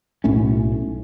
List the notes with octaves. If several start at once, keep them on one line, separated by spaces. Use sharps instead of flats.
B1 A2 A3 C#4